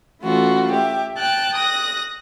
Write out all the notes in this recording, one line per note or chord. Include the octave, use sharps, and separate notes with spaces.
E3 A3 C#4 F4 F#4 A4
G4 E5
G5 A5 F#6 A6
D#6 F#6 A#6